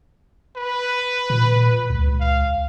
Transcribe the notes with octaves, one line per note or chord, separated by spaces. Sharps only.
B4
A#2
C#2
F5